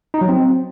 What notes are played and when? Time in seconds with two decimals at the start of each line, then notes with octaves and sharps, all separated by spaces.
0.14 D#4
0.21 F#3
0.29 C4